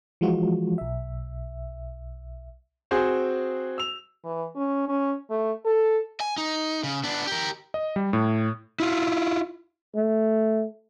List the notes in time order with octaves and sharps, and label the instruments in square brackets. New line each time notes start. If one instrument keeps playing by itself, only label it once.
[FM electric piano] E3 F3 G#3 F4 F#4
B1 E5
[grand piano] C4 F#4 G#4 C5
E6 F7
[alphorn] E3
C#4
C#4
A3
A4
[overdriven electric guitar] G#5
D#4
C#3
B3 D4
G4 A#4
[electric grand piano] D#5
G3
A2
[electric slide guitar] E4 F4
[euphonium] A3